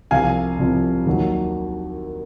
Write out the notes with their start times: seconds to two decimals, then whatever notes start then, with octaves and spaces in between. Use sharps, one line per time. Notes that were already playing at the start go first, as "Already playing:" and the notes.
0.11 C2 C3 F3 F5 G#5
0.59 C2 C3 F3
1.06 D#2 D#3 F#3